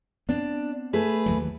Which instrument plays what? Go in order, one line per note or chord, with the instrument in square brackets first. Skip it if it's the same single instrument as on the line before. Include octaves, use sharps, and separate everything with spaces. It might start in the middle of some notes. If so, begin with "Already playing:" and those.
[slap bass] B3 C4 [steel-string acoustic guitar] D4
[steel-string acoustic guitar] A3 G#4 B4
[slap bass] D#2 E3 F#3